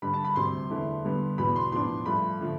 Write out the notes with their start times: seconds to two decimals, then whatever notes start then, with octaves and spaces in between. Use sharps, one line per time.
0.02 G2 D3 G3 B5
0.14 A5
0.24 B5
0.36 D2 C3 G3 C6
0.70 E2 D3 A3 E4
1.04 G2 D3 G3 B3
1.38 E2 B2 B3 B5
1.56 C6
1.72 A2 F3 B3 D4 C6
2.06 G2 F3 A3 B5
2.41 D3 F3 A3